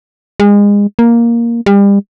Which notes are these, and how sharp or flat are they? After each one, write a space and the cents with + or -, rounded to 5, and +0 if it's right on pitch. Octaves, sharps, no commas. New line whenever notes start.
G#3 -30
A#3 +5
G3 +35